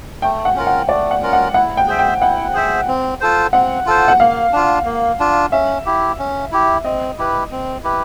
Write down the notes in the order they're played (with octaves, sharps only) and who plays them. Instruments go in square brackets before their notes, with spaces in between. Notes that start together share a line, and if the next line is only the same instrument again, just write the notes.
[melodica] A3 [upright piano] G5
[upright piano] F#5
[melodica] C#4 F4 A#4
[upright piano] F#5
[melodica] A3 [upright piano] D5
[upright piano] F#5
[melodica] C#4 F4 A#4
[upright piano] F#5
[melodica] E4 [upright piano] F#5
[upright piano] G5
[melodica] G#4 C5 E5
[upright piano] G5
[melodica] E4 [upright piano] F#5
[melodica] G#4 C5 E5
C4
F4 A4 C5
[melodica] C4 [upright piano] F#5
[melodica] F4 A4 C5
[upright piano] F#5
[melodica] A#3 [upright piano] F5
[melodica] D4 F4
A#3
D4 F4
[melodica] C#4 [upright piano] E5
[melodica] E4 G4
C#4
E4 G4
[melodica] C4 [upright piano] D#5
[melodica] E4 G4 B4
C4
E4 G4 B4